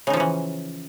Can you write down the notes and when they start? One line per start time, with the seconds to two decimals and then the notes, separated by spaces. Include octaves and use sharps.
0.07 C#3
0.10 D#4
0.13 F3
0.17 C#4
0.20 E3